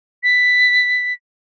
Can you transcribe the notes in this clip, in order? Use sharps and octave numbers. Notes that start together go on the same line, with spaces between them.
B6